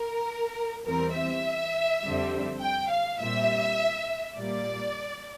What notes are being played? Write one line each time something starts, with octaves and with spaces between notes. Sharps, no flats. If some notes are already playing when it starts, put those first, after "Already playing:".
Already playing: A#4
E2 E3 G3 C4 A#4
E5
F2 D3 G3 C4
G5
F5
A#2 G3 C4 E5
A#2 G3 A#3 D5